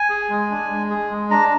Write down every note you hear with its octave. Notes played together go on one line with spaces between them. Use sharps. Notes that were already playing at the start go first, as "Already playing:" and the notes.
Already playing: G#5
G#4
G#3
D4
G#3
G#4
G#3
D4 A#5